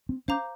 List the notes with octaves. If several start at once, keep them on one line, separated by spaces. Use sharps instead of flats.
C4
C#4 C5 F5 A#5 D6 G6